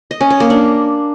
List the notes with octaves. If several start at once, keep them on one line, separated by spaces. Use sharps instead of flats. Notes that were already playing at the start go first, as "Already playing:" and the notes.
D#5
C#4
C#5
A#3
D4